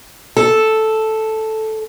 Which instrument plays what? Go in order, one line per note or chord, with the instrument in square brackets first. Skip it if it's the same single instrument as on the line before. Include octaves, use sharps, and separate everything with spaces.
[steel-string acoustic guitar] A4